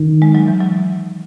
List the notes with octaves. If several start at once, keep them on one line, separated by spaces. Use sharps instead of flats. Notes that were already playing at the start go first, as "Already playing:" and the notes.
Already playing: D#3
G#3
F#3
E3
F#3